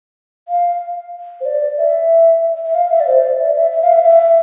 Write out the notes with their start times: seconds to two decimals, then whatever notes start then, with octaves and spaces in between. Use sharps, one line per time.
0.48 F5
1.41 C5
1.45 D5
1.78 E5
2.66 E5
2.75 F5
2.91 E5
3.00 D5
3.07 C5
3.23 D5
3.39 E5
3.56 E5
3.72 E5
3.82 F5
3.93 E5
4.04 E5